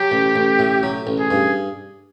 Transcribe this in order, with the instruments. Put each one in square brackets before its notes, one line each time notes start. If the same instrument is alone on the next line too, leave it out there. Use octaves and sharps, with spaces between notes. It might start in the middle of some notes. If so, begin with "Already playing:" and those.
Already playing: [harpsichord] F#3 [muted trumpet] G4
[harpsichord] A1
A1
A2
F#3
A1
[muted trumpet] G#4
[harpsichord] G2